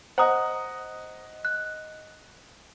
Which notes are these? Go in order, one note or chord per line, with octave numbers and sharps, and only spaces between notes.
C5 D#5 F#5 A#5 D#6
F#6